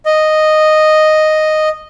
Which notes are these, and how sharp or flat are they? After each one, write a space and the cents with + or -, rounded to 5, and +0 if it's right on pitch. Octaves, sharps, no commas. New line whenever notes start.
D#5 -5